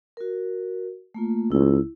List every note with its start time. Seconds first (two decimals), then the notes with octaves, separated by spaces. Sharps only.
0.17 F#4 A#4
1.15 A3 A#3 F4
1.52 C#2 E4